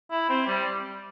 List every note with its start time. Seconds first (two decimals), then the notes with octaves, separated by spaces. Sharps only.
0.11 E4
0.29 C4
0.47 G3